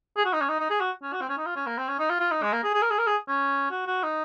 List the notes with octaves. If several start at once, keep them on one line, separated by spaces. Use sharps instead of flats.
G#4
F#4
D#4
C#4
D#4
D#4
G#4
F#4
C#4
F#4
C4
C#4
D#4
F4
C#4
A#3
C4
C#4
D#4
F4
F4
D#4
G#3
A#3
G#4
G#4
A#4
G#4
A#4
G#4
C#4
F#4
F#4
D#4